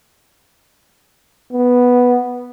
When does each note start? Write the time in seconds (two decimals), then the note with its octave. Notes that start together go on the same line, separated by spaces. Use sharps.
1.53 B3